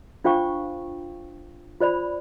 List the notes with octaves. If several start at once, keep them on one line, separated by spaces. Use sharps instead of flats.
D4 F4 C5 F5 G5 C#6
F4 C5 D5 B5